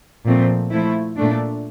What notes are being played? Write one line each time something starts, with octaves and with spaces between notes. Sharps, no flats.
A#2 F3 A3 C4
F3 A3 E4
A#2 A3 D4